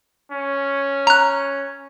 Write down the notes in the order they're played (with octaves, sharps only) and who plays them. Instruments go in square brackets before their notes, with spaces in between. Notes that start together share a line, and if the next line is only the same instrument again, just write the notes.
[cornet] C#4
[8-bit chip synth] A#5 F#6